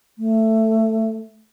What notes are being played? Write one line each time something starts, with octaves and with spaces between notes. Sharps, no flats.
A3